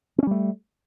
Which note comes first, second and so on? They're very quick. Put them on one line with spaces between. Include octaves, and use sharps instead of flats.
C4 C#4 G3 A3